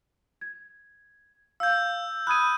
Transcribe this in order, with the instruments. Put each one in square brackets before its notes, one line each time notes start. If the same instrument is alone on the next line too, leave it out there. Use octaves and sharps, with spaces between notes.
[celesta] G#6
[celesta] F5 [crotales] E6 G6
[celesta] B5 D#6 G#6 [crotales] F#6 D#7